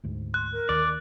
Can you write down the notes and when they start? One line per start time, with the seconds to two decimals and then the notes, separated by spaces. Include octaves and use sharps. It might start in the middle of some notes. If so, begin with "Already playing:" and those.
0.04 D2 G#2
0.34 C6 F#6
0.52 A#4
0.69 D#2 D5